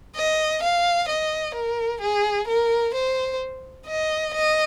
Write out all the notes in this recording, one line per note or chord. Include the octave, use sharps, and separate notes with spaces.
D#5
F5
D#5
A#4
G#4
A#4
C5
D#5
D#5